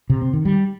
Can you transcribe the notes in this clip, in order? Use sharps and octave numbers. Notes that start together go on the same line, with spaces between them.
C3
C4
D#3
G3